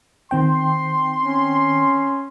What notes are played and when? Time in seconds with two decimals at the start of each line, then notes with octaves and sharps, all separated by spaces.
0.31 D#3 C4 G5 C6
1.22 C#4